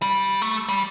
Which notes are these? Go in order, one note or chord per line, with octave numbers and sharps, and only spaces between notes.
G3
A3
G3